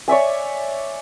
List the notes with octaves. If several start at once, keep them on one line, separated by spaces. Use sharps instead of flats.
C#5 D5 E5 G#5